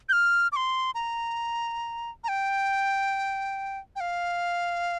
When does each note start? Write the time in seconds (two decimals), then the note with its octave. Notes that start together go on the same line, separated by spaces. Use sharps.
0.09 G6
0.13 F6
0.52 D6
0.56 C6
0.95 A#5
2.24 A#5
2.28 G5
3.96 G5
4.00 F5